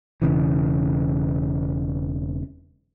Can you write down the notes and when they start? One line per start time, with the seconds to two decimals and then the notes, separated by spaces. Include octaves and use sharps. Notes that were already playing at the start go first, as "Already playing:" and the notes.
0.22 E1 C#3 E3